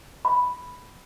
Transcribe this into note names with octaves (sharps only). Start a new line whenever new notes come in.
B5